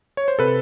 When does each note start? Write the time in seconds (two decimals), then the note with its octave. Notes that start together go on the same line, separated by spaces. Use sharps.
0.17 C#5
0.28 C5
0.39 C3 A4 B4